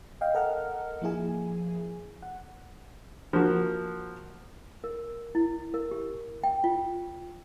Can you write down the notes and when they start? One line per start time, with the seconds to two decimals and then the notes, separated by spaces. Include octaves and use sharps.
0.21 D#5 F5 G5
0.34 A4 A#4 D#5 F#5 F6
1.02 F3 A#3 E4 G#4 G#5
2.22 F#5
3.33 F3 A#3 F#4
4.84 A#4
5.35 E4
5.74 A#4
5.91 G4
6.43 G5
6.64 F4